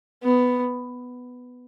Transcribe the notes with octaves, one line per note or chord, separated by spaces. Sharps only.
B3